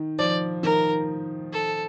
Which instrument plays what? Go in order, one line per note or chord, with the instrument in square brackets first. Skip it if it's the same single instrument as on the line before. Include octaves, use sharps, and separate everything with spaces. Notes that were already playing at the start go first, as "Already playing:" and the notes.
Already playing: [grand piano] D#3
[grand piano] F3 [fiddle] D5
[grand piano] D#3 [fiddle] A#4
[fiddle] A4